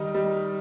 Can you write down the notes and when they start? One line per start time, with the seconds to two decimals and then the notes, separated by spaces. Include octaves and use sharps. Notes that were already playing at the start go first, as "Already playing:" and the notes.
Already playing: D#3 G3 D#4
0.15 G3